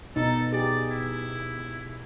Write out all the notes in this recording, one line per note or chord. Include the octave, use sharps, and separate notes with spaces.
B2 D#4 A4
G4 G#4 D5
E4